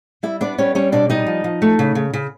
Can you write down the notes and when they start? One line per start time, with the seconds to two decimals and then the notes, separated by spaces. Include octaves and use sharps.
0.23 G3 E4 E5
0.41 B3 D4 D5
0.58 G3 C#4 C#5
0.75 G3 C#4 C#5
0.92 B2 D4 D5
1.10 G3 D#4 D#5
1.27 F3
1.44 F3
1.62 A3
1.79 C#3
1.95 C#3
2.14 C#3